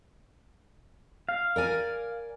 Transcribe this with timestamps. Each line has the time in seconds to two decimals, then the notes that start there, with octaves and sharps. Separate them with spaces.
1.29 F5
1.56 A#4 D5 G#5